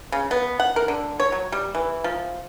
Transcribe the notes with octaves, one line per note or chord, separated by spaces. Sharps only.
C#3
B3
F#5
A#4
D3
C#5
F#3
G3
E3
F3